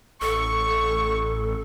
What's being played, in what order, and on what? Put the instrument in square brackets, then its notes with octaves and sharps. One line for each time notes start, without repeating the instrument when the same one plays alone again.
[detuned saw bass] A1 [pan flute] A4 [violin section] C#6